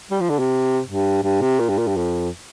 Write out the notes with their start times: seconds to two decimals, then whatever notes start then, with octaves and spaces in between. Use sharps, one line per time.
0.11 G3
0.20 F3
0.30 D3
0.39 C3
0.86 G2
1.23 G2
1.41 C3
1.59 A#2
1.69 G2
1.78 A#2
1.87 G2
1.96 F2